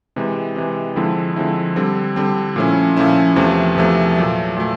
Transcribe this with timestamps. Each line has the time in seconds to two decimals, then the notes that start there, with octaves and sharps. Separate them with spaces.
0.16 C3 E3 G#3
0.56 C3 E3 G#3
0.96 D3 F3 G#3 C4 E4
1.36 D3 F3 G#3 C4 E4
1.76 D3 G3 C4
2.16 D3 G3 C4
2.56 A#2 F3 A3 C#4 E4
2.97 A#2 F3 A3 C#4 E4
3.36 E2 C3 F3 A3
3.76 E2 C3 F3 A3
4.16 A#2 F#3 A3
4.57 A#2 F#3 A3